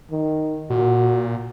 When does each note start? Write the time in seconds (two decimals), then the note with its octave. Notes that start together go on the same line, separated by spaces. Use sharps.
0.11 D#3
0.70 A#2 F#4